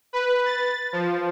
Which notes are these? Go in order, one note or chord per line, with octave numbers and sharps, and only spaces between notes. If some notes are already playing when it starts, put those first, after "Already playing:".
B4
A6
F3